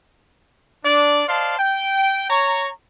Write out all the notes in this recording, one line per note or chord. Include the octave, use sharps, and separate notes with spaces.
D4 D5
C5 D5 D#5 F5 A5 C6
G5
C#5 A#5 C#6